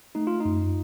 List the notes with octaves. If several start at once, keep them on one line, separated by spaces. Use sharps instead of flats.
A3 D#4
F4
F#2 D#4